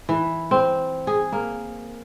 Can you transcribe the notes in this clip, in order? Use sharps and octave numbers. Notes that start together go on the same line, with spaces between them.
E3
C4
G#4
A#3